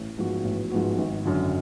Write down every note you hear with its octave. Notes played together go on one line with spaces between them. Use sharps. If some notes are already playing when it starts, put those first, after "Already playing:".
Already playing: A1
G#2 F3 B3 F#4
A1
G#2 F3 B3 F#4
G#1
F#2 D3